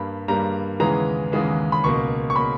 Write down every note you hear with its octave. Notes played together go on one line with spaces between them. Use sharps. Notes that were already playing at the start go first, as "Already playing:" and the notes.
Already playing: G2 G3 A#3 B5
G2 G3 A#3 A#5
D#2 C#3 E3 G#3 B3 A#5
D#2 C#3 E3 G#3 B3
B5
C#2 B2 A#3 C#6
C#6
B2 A#3 B5